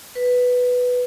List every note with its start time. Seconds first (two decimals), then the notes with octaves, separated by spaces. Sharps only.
0.15 B4